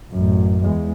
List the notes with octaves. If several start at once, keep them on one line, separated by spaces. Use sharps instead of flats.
A1 F#2
E2 G#3